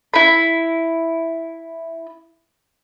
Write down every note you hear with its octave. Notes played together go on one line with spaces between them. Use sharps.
E4 B5